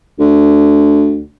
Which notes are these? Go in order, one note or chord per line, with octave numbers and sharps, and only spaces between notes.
D2